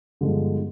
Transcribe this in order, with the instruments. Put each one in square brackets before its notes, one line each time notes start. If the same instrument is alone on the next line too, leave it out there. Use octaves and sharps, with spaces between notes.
[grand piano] G2 D3 F3 G#3 B3